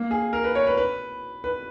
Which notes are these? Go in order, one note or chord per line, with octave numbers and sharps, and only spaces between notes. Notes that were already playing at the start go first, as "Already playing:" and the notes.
Already playing: A#3
G#4
A#4
B4
C#5
B4
B4
B4